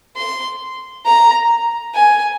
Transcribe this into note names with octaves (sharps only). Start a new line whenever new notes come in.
C6
A#5
G#5